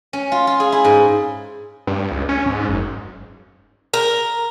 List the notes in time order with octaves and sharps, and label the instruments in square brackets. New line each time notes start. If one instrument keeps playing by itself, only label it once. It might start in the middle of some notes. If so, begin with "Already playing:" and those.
[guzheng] C#4
F4
F4
G#4
E4
G#2
[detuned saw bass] G2
C#2
C#4
G#2
F#1
[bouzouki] A#4